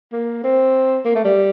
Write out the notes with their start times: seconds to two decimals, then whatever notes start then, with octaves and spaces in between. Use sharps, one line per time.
0.13 A#3
0.44 C4
1.05 A#3
1.15 A3
1.25 G3